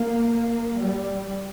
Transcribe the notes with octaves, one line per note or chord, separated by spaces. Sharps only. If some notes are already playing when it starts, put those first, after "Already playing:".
Already playing: A#3
A#3
G3